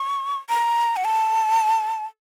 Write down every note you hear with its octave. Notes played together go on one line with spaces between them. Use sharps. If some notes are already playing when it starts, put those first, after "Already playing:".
Already playing: C#6
A#5
F#5
A5